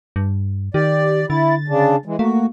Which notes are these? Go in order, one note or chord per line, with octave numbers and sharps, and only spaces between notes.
G2
D#3 G4 D5
D3 E4 A6
C#3 D4
E3 G#3
A3 A#3 F#4